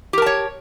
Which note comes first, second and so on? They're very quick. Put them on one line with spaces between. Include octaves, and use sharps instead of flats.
G4 A#4 A5 C#5